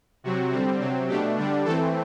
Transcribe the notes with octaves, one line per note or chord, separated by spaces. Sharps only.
C3 F#3 C4 F#4
D3 G3 C4
C3 F#3 C4
B2 A3 D4 G4
D3 G3 D4
E3 A3 C4 A4